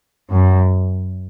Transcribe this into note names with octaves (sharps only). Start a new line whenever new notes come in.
F#2